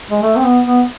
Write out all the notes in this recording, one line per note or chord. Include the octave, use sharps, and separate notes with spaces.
G#3
A3
C4
B3
B3